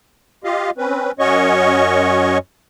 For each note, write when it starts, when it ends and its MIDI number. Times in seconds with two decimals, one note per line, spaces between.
0.44 0.70 65
0.44 0.70 67
0.44 0.70 75
0.44 0.70 77
0.78 1.11 60
0.78 1.11 61
0.78 1.11 71
1.19 2.38 42
1.19 2.38 61
1.19 2.38 66
1.19 2.38 73
1.19 2.38 75
1.19 2.38 85